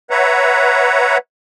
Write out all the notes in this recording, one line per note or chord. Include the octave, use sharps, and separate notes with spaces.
B4 C#5 E5 F#5 A#5